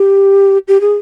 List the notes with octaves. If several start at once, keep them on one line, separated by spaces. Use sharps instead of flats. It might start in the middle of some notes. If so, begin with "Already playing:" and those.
Already playing: G4
G4
G#4